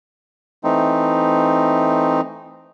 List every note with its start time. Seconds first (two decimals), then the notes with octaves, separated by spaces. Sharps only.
0.64 E3 A3 C4 D#4